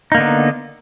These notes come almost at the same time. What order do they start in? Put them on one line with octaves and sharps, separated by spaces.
D#4 A#3 D3 B3